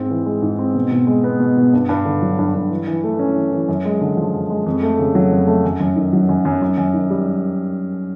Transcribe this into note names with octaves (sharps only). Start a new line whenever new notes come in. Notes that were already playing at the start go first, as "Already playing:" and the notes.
Already playing: G#2 C4
E3
G#3
G#2
C4
B2
B2
G#3
B3
B2
B2
G2
G2
D3
F#3
G2
G2
E3
E3
A3
C#4
E3
E3
F#2
G#3
D3
F3
F#2
G#3
F2
A3
C#3
F#3
F2
A3
F#2
F#2
D#3
F#3
F#2
F#2
F#2
F#2
D#3
G3